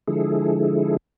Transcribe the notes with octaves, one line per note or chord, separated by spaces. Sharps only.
D3 F3 G#3 E4 G#4 A4